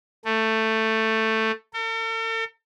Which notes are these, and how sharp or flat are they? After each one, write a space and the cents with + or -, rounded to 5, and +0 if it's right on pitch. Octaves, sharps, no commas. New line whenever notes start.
A3 +10
A4 +45